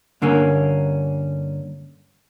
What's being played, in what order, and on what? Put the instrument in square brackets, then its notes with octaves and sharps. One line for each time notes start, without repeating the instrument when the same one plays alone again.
[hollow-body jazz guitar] G2 D3 A#3 C#4